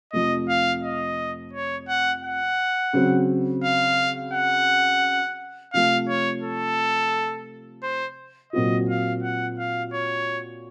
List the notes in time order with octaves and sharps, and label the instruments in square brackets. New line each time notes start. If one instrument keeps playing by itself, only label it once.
[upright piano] F2 C3 F3 A3 [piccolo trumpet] D#5
[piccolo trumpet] F5
D#5
C#5
F#5
F#5
[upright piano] C#3 F#3 C4
[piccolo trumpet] F5
F#5
[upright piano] C3 F3 A3 [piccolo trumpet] F5
[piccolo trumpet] C#5
A4
C5
[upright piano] A#2 F#3 C4 F4 [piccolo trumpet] D#5
[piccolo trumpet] F5
F#5
F5
C#5